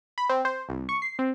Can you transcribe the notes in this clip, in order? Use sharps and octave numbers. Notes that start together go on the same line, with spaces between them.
B5
C4
C5
C2
C#6
C7
C4